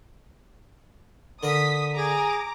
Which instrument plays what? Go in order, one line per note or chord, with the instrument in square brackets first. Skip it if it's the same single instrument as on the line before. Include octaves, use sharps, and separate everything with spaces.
[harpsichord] D3 A#4 [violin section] D#6 B6
[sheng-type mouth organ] G#4 G#5 [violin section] A#5 D6